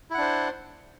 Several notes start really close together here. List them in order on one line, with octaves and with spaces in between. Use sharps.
E4 F#5 D4 C5